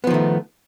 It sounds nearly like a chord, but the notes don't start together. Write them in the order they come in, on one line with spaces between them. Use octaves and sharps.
B3 F3 D#3 A3